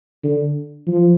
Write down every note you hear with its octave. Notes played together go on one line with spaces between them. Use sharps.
D3
F3